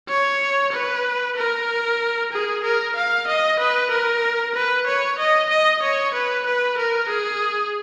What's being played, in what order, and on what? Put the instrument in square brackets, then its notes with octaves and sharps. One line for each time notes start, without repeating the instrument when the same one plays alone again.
[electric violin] C#5
B4
A#4
G#4
A#4
F5
D#5
B4
A#4
B4
C#5
D#5
D#5
C#5
B4
B4
A#4
G#4